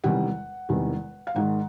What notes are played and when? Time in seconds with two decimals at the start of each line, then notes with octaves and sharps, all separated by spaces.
0.04 E1 E2 C3 D#3 G3 F#5
0.69 E1 E2 C3 D#3 G3
1.27 F5
1.35 G#1 G#2 D#3 G#3 F#5